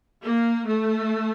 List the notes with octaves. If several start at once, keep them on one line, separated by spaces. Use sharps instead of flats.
A#3
A3